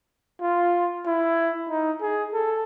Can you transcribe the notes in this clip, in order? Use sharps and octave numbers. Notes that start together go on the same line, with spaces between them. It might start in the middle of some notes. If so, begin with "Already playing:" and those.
F4
E4
D#4
G#4
A4